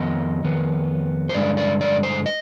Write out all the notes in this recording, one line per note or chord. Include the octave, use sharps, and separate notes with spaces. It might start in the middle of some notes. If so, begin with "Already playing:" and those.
Already playing: F2 D#3 B3 D#5
F2 D#3 B3
C5
G2 D3 G#3 D5
D5
D5
C5
D#5